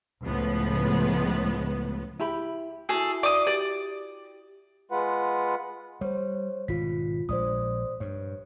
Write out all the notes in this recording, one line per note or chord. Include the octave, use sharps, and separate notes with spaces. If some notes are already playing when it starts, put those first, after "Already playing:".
C#2 A2 F3 B3
E4 G4 B5
E4 F#4 G#4 A4
D5 D6 D#6
G4 D5
G#3 F4 B4 F#5
G3 C5 C#5
G#1 B2 F4 B6
A#1 G#3 C5 D5 D#6
G2 C#5